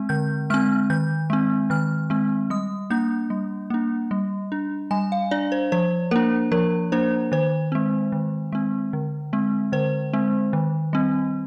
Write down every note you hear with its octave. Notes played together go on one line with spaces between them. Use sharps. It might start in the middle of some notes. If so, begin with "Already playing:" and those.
Already playing: G#3 C4
D3 G6
G#3 C4 F6
D#3 G6
G#3 C4
D#3 F6
G#3 C4
G3 D#6
A#3 D4 G6
G3
A#3 D4
G3
D4
G3 G#5
F5
D4 D5
C5
F3 C5
A#3 D4 A#4
F3 A#4
A#3 D4 C5
D#3 C5
G#3 C4
D#3
G#3 C4
D3
G#3 C4
D3 C5
G#3 C4
D#3
G3 C4